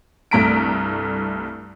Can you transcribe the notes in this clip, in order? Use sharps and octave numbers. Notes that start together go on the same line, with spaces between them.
C2 G2 A3 A#5 B6 D7